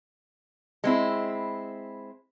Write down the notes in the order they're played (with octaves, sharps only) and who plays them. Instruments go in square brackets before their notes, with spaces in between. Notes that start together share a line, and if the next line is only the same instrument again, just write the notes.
[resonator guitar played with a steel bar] G#3 C4 E4